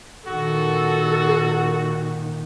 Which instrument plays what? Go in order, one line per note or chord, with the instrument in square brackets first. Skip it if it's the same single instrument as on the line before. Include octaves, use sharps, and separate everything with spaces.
[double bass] A#2 D#3 [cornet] F#4 [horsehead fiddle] A4